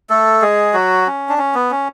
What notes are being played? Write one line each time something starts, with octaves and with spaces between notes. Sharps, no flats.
A3 A4
G#3 G#4
F#3 F#4
C#4
D4
C#4
B3
C#4